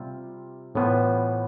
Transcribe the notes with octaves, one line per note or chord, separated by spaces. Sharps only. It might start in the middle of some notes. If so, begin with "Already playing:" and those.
Already playing: C3 G3 C4 F4
A2 E3 B3 F4 C5